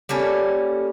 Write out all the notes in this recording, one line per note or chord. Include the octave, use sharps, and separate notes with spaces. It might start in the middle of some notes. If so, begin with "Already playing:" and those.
G3 A#3 C#4 A4